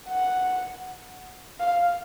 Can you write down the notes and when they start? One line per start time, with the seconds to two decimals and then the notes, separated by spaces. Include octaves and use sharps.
0.09 F#5
1.60 F5